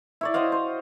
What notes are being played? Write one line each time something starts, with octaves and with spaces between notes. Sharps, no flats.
E4 C#5 D5
F#4 C5 D#5 F5
C5